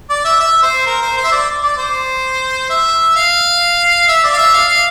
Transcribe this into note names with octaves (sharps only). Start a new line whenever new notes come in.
D5
E5
E5
C5
A#4
C5
C5
E5
D5
D5
C5
E5
F5
E5
D5
F5
E5
F5
F5